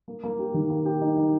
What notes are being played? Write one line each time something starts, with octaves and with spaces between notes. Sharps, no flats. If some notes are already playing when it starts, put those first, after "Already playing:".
A#3
A#3
G4
D#3
A#3
G4
D#4
D#4